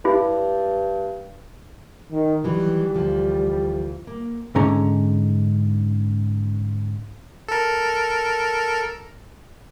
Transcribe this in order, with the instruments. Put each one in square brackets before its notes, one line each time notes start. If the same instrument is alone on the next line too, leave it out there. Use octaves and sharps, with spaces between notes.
[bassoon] G2 [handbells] E4 G4
[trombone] D#3
[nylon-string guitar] D#3 E3 F#3 [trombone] G3
[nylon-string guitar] D2 E3 F3
A#3
[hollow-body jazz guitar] G#2 D3 C#4 A#5
[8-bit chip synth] A4 A#4